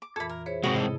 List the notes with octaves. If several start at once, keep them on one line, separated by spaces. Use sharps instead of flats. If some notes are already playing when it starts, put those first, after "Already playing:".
D6
F2 A#2 E3 A4 B5
A#4
E4 G#4 C5 C#5
G#2 C3 G#3 C4 F#4 B4 C#6
A3 E4 G#4 A4 D#5